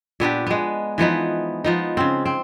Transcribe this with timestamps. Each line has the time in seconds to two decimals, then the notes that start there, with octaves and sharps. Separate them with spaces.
0.20 A#2 B3 D4 G4
0.47 G#3 B3
0.98 E3 F3 B3 D#4
1.64 F3 B3 D#4
1.97 C#3 C4
2.26 C4